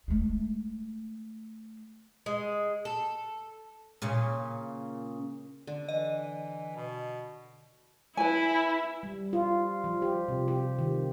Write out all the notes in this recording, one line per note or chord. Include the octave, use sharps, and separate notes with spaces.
G#3 A3
G#3
A4
A#2 C#3 C#4
D3
E3 D#5
B2
E4 B4 G#5
G3
F4
F3
G4
C3
G4
D#3